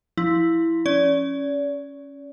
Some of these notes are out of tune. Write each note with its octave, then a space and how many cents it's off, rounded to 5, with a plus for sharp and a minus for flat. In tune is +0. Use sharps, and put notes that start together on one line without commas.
F3 -5 E4 +0
C#4 +0 D5 -35